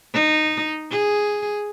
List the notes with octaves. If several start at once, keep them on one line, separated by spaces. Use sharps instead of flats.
D#4
G#4